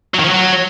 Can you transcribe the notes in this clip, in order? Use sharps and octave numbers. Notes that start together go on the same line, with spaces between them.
F#3
D#3
F3
F#3